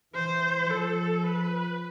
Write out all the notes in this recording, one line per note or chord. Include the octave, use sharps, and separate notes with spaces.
E3 C5
F3 A4
B4